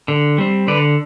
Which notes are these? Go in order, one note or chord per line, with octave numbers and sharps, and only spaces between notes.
D3
G3 C4
D3 B4 D5